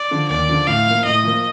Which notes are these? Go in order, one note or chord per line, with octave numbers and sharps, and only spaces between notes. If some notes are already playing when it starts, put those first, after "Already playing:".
Already playing: D5
D3 F3
D#2 D5
D3 F3
A2 F5
F3 A#3
A2 D#5
F3 A#3